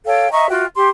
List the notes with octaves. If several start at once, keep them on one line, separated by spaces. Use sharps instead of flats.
A4 C#5 F5 G5
D#5 E5 A#5 C#6
F4 F#4 E5 G5
G4 C6